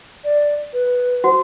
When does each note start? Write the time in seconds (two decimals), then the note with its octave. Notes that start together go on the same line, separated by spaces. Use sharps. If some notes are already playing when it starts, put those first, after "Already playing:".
0.24 D5
0.73 B4
1.24 F#4 C5 F#5